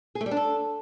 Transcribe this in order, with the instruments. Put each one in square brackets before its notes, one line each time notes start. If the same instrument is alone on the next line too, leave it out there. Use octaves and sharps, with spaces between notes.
[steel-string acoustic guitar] G#4
A3
G3
D4
A4